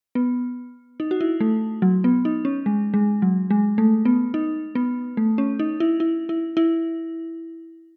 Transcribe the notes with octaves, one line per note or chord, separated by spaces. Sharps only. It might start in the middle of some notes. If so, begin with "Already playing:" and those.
B3
D#4
F#4
E4
A3
F#3
B3
D#4
C#4
G#3
G#3
F#3
G#3
A3
B3
D#4
B3
A3
C#4
D#4
E4
E4
E4
E4